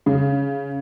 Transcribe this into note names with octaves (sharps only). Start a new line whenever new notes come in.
C#3